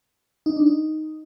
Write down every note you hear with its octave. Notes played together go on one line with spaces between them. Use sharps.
D#4
D4
D#4